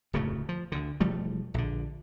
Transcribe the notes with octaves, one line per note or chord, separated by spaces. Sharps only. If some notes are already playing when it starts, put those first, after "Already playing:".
D1 F2 C#3 A3
F3
D2 D3
E1 F3 G3 A3
A#1 D3